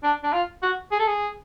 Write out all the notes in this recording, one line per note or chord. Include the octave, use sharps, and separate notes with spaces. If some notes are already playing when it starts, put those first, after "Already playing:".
D4
D4
F4
F#4
G#4
A4
G#4